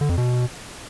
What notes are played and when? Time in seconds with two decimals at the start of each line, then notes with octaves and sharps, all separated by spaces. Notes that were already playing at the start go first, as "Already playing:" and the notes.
0.01 D3
0.09 F2
0.18 B2